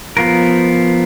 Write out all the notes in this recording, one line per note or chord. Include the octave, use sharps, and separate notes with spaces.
F3 B3 F4 A#4